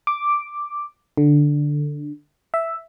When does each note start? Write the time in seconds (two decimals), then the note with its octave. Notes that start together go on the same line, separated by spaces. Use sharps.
0.07 D6
1.17 D3
2.54 E5